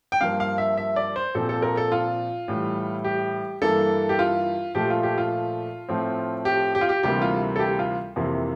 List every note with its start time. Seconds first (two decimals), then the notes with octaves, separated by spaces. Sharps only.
0.12 G5
0.21 G2 F3 A#3 F5
0.40 F5
0.58 E5
0.78 E5
0.96 D5
1.16 C5
1.35 A#2 F3 C4 A4
1.49 A4
1.62 A#4
1.77 A4
1.92 F4
2.48 A2 E3 G3
3.05 G4
3.62 G2 E3 A#3 A4
4.09 G4
4.19 F4
4.75 A#2 F3 A3 G4
4.90 F4
5.03 G4
5.18 F4
5.89 A2 F3 A3 C4
6.45 G4
6.75 G4
6.81 F4
6.89 G4
7.03 D2 C3 E3 G3 A#3 G4
7.22 F4
7.56 A4
7.59 G4
7.79 F4
8.16 F2 C3 E3 A#3